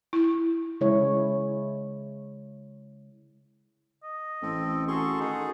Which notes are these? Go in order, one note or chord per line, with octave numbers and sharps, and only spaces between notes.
E4
C#3 G#3 E4 C#5
D#5
A1 C4 A4
F#4 G#4 A4 C6 C#6
D#3 D#4 G#4